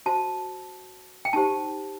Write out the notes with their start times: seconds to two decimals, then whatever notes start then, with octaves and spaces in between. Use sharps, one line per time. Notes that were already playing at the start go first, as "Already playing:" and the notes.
0.06 F#4 C5 A5
1.25 G5
1.33 D#4 G4 C5 A5